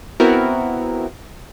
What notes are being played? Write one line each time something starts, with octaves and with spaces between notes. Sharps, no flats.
B3 C4 E4 F#4 A#4